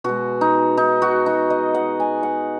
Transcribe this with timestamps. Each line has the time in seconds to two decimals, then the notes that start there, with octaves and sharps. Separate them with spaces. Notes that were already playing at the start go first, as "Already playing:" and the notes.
0.04 B2 G#3 F#4
0.41 D#4
0.77 D#4
1.02 F#4
1.26 D#4
1.50 D#5
1.74 F#5
2.00 G#5
2.23 F#5